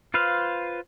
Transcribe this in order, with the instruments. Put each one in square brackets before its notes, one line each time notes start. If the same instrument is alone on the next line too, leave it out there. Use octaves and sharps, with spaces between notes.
[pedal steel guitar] F4 B4 C5 F5